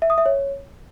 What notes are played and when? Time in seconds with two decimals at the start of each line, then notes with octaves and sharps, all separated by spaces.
0.02 E5
0.10 D#6
0.18 E5
0.26 C#5